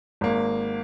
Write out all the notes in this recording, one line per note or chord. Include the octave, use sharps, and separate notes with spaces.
G#1 A#3